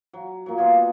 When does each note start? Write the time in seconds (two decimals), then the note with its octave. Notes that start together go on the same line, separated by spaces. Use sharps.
0.13 F#3
0.46 A#2 F#3
0.58 B2 G3 F4 G#4